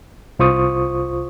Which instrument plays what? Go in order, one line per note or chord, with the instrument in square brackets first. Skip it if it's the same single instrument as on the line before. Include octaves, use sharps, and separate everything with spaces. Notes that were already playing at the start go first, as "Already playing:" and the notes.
[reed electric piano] C2 F4 C5 C#6 D#6